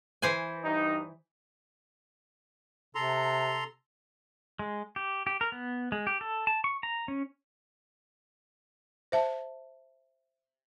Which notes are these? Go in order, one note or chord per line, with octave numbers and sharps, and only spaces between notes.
E3 C5 G#5
G2 D#4
C3 A4 A#5 C6
G#3
G4
G4
A#4
B3
G#3
G4
A4
A5
C#6
A#5
C#4
C5 E5 A5